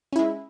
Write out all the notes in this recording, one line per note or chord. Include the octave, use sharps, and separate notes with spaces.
G#3 C#4 E4